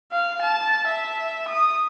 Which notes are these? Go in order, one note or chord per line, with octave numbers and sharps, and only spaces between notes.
F5
A5
E5
D#6